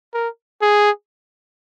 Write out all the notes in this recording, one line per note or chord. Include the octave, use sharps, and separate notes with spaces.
A#4
G#4